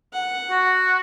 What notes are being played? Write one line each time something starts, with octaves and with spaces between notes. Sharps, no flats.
F#5
F#4